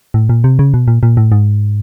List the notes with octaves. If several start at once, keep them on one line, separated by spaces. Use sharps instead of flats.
A2
A#2
C3
C#3
B2
A#2
A#2
A2
G#2